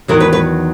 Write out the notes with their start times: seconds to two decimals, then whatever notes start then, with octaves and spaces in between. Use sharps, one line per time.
0.08 E2 D#3 F#3 A#4
0.20 B4
0.33 B4